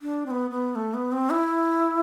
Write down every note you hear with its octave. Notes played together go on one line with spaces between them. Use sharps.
D4
C4
B3
B3
A3
B3
C4
E4